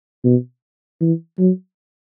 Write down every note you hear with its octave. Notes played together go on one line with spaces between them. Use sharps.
B2
E3
F#3